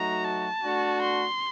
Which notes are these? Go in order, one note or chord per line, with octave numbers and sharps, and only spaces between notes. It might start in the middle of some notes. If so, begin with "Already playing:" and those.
Already playing: F#3 A3 D#4 F#4 A#5
A5
A3 D4 F#4
C6